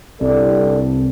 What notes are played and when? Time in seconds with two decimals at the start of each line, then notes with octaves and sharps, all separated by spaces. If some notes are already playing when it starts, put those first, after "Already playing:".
0.21 C2 G2 A4 D5